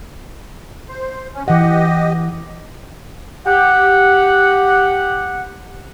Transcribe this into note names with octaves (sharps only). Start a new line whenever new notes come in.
C5
C#4
E3 G4 D#5 F#5
G4 F#5